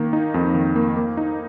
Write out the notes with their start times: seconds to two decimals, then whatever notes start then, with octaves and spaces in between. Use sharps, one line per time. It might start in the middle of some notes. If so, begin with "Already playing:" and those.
Already playing: D#3 A#3
0.13 D#4
0.34 F2
0.54 D#3
0.76 A#3
0.97 A#3
1.17 D#4